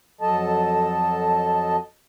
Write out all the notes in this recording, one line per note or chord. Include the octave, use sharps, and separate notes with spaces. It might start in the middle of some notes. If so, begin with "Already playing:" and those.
F2 F#3 A4 D#5 A5